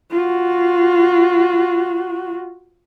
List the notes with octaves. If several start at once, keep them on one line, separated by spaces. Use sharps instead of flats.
F4 F#4